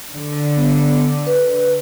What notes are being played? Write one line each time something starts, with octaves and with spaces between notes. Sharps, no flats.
D3
B3
B4